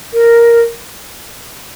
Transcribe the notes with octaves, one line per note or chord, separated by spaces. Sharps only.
A#4